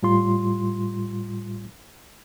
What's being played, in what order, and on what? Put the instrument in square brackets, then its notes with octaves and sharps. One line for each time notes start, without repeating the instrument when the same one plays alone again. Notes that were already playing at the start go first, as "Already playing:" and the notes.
[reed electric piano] A2 G3 F4 C6